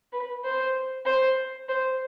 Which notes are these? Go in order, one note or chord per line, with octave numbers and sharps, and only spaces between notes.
B4
C5
C5
C5